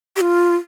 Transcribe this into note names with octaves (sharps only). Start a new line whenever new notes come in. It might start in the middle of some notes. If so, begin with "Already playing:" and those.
G4
F4